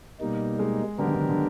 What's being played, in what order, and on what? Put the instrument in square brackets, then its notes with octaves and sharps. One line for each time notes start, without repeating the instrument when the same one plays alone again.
[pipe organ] B2 G3 A#3 D#4
[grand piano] G#3
[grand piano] D3 [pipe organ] F#3 B3 D4 G4 A#4
[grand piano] D#3
D3
D3